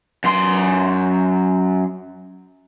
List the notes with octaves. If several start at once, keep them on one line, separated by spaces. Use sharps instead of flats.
F#2 C6